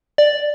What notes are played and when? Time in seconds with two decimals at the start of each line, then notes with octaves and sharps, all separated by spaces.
0.18 D5